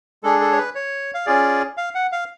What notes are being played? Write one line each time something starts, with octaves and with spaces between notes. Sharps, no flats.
G#3 D4 G#4 A4
A4
C#5
B4
C#5
F5
C#4 F4 G#4 D5
F5
F#5
F5